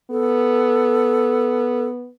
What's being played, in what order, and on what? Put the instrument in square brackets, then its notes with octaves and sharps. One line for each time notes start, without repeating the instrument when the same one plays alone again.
[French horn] B3 [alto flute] A4